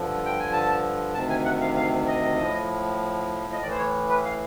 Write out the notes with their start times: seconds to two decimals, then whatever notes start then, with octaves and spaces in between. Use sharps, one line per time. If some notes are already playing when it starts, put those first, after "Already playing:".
Already playing: G2 D3 F3
0.26 G5
0.39 G#5
0.53 A5
1.14 D2 C3 D#3 A5
1.30 G#5
1.45 F#5
1.61 F5
1.77 F5
2.07 D#5
2.39 A2 F3
3.53 D#5
3.62 A2 D5
3.66 E3 C5
3.78 C#5
4.09 B4
4.25 F5